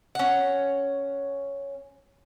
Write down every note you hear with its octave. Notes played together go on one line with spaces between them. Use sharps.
C#4 F#5